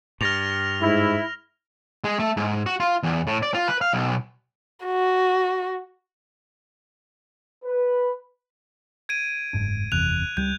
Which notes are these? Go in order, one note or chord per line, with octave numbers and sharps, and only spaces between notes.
G2 F6 A#6 F7
G#2 E4
G#3
A3
G#2
F#4
F4
E2
A2
D5
F4
B4
F5
B1
F#4
B4
G#6 D7 D#7
F#1 G#2 D4
F#1 E2 C3 F#6 F7
C#2 G3 G6